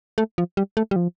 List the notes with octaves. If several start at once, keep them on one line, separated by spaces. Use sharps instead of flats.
A3
F3
G3
A3
G3
F3